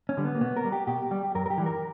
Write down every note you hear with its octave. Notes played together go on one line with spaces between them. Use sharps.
C#4
D3 G3
B3
A#3
B2 B3
A#4
G3
G4
B2 G4
G3
F#2 A#4
A#4
G4
E3 G3
A#4